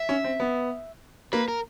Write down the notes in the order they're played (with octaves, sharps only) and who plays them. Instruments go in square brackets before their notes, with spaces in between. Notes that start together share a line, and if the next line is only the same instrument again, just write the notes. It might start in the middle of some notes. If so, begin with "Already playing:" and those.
Already playing: [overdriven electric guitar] E5
[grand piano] C#4
C4
B3
[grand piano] A#3 [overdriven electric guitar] B4
[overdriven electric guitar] A#4